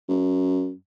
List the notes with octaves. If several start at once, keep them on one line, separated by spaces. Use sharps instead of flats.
F#2